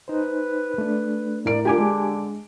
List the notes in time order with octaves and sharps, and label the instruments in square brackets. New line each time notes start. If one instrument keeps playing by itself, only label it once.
[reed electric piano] D#4 C5 [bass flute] B4
[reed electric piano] A3 D4
[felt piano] A2 A#4 D7 [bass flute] D5
[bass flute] D3 [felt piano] F4 A#4 [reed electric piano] G4 G#5 D6
[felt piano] G#3